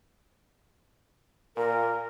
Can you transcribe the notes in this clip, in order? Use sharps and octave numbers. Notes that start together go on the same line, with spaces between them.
A#2 A#4